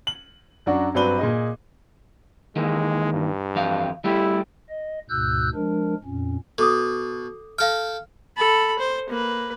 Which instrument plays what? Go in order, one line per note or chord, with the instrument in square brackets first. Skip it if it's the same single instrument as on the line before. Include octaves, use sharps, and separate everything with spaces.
[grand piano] F#7
F#2 F#3 D4 F#4
G2 F#3 C4 D4 B4 G7
A#2 G#4 D#5
[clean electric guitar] D#3 E3 A#3 [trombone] G#3
[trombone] G2
[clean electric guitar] F2 E3 F5
[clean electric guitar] G3 A3 G4 [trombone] E4
[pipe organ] D#5
D2 G#2 B2 E6 F#6 G6
F3 G#3 D4 A#4
F2 A#2 C#4
[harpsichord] B2 [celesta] A4 D6 D#6
[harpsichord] A4 G5 [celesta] F5 F6
[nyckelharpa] A4 B5
C5
A#3 B4